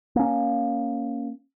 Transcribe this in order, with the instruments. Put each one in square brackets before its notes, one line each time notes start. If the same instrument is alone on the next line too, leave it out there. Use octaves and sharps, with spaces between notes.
[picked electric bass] A#3 C#4